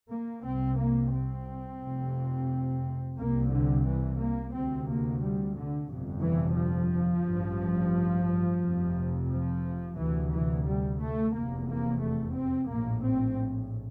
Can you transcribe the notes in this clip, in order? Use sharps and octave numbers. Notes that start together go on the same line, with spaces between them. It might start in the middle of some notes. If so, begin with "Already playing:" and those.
A#3
C2 C3 C4
A#3
C4
F1 F2 C3
C2 C3 A#3
D3
E3
A#3
D2 C3 C4
A#3
G3
D3
G1 F2 C3
E3
F3
A1 G2
F1 F2 C3
F3
D2 C3 E3
E3
G3
A3
F1 E2 C3 A#3
A#3
A3
C4
A#1 A2 A#3
C4